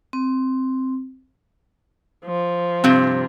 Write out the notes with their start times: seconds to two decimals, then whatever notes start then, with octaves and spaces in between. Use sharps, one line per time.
0.13 C4
2.25 F3
2.84 G2 C3 C4